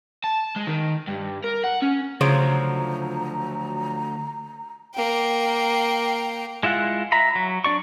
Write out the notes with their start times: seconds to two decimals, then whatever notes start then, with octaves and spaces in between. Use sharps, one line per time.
0.24 A5
0.56 G#3
0.67 D#3
1.08 G2
1.44 A#4
1.64 F#5
1.82 C#4
2.21 D2 C#3 F3 F#3 A#5 C6 D7
4.95 A#3 G5
6.63 G#3 E4 F4 F#5
7.12 E5 A#5 B5
7.36 F#3
7.64 D4 D5 C#6